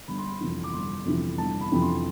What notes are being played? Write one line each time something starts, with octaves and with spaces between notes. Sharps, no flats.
G1 B5
C6
B5
F2 C3 E3
D6
G1 C6
F2 C3 E3
G1 A5
B5
F2 C3 E3 B5
C6